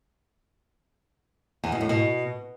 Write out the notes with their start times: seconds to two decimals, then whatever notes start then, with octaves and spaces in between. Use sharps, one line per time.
1.64 E2
1.72 B2
1.81 A2
1.89 B2